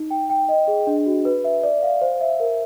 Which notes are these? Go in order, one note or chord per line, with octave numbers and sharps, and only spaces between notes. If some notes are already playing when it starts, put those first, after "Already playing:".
Already playing: D#4
G5
G5
D#5
G#4
D4
F#4
B4
E5
D5
F5
C5
E5
A#4